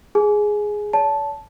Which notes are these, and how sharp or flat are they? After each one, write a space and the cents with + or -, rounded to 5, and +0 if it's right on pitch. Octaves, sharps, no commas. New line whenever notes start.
G#4 +0 G#5 +25
C#5 +45 A5 -10